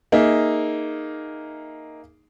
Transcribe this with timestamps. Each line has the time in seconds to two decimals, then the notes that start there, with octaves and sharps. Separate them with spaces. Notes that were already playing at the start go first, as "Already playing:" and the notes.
0.12 A#3 D#4 G#4 E5